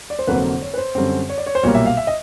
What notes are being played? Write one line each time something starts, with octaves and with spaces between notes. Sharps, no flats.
D5
C5
F1 F2 D3 F#3 A#3 B4
C5
C#5
B4
C5
F#2 D3 G3 C4
C#5
D5
C#5
C5
B1 A#2 G3 A#3 C#5
E5
F5
E5
D#5